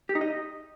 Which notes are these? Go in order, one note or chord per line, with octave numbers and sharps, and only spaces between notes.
G4
D#4
D#5